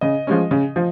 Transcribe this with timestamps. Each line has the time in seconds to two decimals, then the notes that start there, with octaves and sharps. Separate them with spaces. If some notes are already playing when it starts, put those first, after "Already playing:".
0.01 C#3 D#5
0.27 F3 G#3 C#4
0.51 C#3
0.76 F3